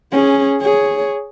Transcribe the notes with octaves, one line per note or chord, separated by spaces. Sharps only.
C#4 G#4
G#4 C#5